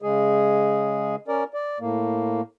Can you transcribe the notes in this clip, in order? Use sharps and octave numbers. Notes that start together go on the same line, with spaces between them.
C#3 G#3 G#4
C#4 A#4 D5
D5
A2 A#3